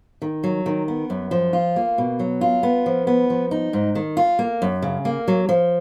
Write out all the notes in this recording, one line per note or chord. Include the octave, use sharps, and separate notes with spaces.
D#3
F#3
D#3
B3
F#2
F3
F4
A#3
B2
F#3
F4
B3
F3
B3
F3
D#4
G#2
D#3
F4
A#3
F#2
C#3
A#3
F#3
F3